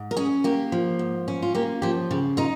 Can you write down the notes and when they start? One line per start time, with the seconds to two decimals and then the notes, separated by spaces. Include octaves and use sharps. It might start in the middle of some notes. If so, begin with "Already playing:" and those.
Already playing: G#2
0.11 A#4
0.17 C#4 G#4
0.44 A#3 G4
0.72 F3
0.99 G#2
1.28 C#4
1.42 F4
1.54 A#3 G4
1.82 F3 G4
2.11 C#3 G4
2.37 D#4 F4